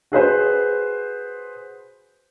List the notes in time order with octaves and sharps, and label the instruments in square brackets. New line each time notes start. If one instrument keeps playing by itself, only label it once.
[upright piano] F#4 G#4 B4 C5